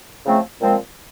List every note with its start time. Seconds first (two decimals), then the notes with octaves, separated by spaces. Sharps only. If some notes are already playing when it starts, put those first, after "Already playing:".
0.24 C#3 F3 A3 C4
0.61 A#2 F3 G#3 C4